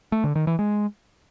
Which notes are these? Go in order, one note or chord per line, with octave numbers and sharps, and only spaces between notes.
A3
D3
D#3
E3
G#3